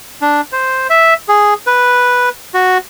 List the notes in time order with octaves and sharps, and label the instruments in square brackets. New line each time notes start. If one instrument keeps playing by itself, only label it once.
[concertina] D4
C5
E5
G#4
B4
F#4